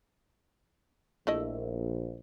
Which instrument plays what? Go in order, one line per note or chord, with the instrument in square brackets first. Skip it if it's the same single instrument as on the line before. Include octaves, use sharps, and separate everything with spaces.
[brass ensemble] A#1 [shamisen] A3 E4 D#5